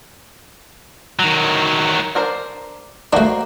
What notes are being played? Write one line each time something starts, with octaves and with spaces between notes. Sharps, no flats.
D#3 F#3
D4 A#4 C5
A3 A#3 D4 F#4 C5